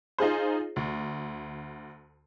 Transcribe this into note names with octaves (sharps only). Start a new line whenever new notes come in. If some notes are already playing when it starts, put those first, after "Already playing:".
D#4 F4 G#4 C5
D2